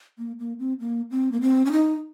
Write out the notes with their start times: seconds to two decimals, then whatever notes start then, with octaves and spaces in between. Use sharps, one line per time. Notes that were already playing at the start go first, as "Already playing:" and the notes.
0.18 A#3
0.39 A#3
0.59 C4
0.80 A#3
1.11 C4
1.32 A#3
1.41 C4
1.65 C#4
1.72 D#4